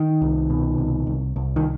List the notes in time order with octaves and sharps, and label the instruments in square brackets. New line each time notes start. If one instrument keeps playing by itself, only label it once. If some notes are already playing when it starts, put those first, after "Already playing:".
Already playing: [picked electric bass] D#3
C2
B2
C2
C2
C2
D#3